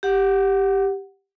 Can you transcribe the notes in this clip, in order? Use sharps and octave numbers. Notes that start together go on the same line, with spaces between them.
G4 F#5